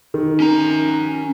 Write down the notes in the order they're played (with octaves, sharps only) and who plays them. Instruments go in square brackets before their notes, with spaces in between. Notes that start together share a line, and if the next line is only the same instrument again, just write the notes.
[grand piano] D#3
[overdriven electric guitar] C#4 A#5